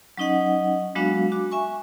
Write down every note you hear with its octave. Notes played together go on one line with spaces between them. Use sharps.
F#3 C#4 D#4 D#5 F#5
F#3 G#3 B3 D4 F#4 F5
F#4 D6
E5 G#5 C#6